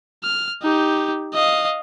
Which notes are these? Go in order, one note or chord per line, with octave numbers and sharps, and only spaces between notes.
F6
D#4 G4
D#5 F5